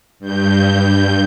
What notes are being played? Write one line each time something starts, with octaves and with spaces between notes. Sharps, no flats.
G2 G6